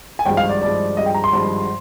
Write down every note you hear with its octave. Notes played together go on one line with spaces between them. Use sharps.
G#5
G#1 G2 F3 G#3 G5
F5
D5
G#1 G2 F3 G#3 D5
G#1 G2 F3 G#3 D#5
G5
A#5
C6
G#1 G2 F3 G#3